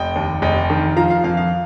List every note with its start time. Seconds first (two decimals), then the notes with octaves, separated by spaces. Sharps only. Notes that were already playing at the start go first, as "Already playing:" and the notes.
Already playing: F1 D#5 G5
0.15 D#2
0.42 F1 D#5 G5
0.70 D#3
0.96 F3 F5 A#5
1.10 F5
1.24 F2 F5
1.37 F5